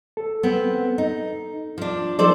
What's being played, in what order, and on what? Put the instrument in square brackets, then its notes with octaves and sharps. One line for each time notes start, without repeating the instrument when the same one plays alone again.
[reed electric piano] A4
[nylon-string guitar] B3 C4
D#4
F3 D4
[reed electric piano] F3 D#4 A#4 [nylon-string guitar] A4 C5 D5